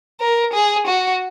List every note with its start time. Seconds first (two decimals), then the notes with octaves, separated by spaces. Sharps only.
0.20 A#4
0.53 G#4
0.87 F#4